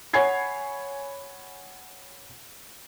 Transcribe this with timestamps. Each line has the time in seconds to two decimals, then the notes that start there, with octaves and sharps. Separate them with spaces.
0.13 C#5 F#5 G#5 B5 G#6 C7